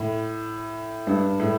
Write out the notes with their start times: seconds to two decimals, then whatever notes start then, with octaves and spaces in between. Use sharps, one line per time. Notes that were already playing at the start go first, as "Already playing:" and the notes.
Already playing: A2
1.07 G2
1.40 A2